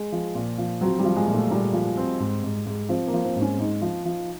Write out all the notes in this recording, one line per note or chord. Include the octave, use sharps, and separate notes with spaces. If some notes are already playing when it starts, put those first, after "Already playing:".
Already playing: G#3
F3
A#2
F3
F#3 C4
G3
F3
G#3
A#2
A3
A#2 G3
F3
C4
G#2
G#2
G#2
F3 C4
A#3
F3
C4
G#2
C#4
G#2 D#4
F3
F3